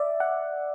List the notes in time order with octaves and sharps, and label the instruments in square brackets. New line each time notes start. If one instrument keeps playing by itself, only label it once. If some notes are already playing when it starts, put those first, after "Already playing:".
Already playing: [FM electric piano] D5 E5
F#5